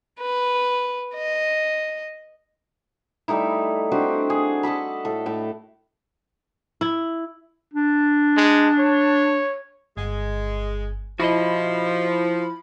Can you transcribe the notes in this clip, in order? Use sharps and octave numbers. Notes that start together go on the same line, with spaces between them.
B4
D#5
G3 A3 D#4 E4
C4 D4 F#4 G4
G#4
A4 D#5 A5 B5
A2 A4
A2 A4
E4
D4
G#3
C#5
G1 G#3
F3 E4 F#4 D#5 B5